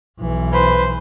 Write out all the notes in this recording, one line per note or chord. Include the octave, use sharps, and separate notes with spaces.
B1 E3
B4 C5